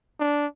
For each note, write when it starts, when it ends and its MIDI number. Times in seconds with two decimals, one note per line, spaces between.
0.20 0.46 62